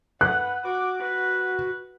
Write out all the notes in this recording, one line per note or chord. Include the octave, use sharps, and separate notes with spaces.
B4 F#5 F#6
F#4 D6
F#4 B4